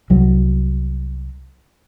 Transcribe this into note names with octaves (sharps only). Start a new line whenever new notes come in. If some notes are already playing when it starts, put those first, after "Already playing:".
C2 F#3